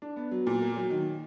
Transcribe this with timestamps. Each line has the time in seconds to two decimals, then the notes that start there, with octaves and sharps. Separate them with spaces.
0.02 D4
0.16 B3
0.31 F#3
0.47 A#2
0.61 A#3
0.76 F#3
0.91 D#3